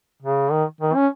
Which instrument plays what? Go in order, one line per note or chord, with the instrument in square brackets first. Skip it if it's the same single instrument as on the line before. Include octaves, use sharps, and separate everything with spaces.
[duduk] C#3
D#3
D#3
C#4